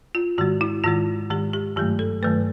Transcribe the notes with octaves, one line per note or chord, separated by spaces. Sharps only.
F4
G#2 D#3 G#3 F#4
E4
G#2 D#3 G#3 F4
G#2 D#3 G#3 G4
G4
G2 D#3 F#3 A3 G4
A4
G2 D#3 F#3 A3 B4